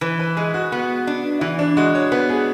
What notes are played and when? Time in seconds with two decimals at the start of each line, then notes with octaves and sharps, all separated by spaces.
0.01 E3 B4
0.19 B4
0.37 G#3 G#4
0.54 F#4
0.72 B3
1.07 D4
1.41 E3 E4
1.59 D4
1.77 G#3 F#4
1.95 C#5
2.12 B3 B4
2.29 G#4